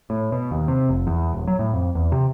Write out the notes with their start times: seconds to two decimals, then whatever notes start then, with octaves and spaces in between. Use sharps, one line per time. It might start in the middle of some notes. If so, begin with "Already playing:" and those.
0.10 A2
0.32 B2
0.51 D#2
0.68 C3
0.89 F1
1.07 E2
1.33 D#1
1.48 F#3
1.59 A2
1.73 F2
1.95 E2
2.12 C3